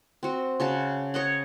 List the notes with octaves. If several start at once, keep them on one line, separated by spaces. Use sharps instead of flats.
C4 F#4
C#3 F#4 A5
C#5 D#5 F#5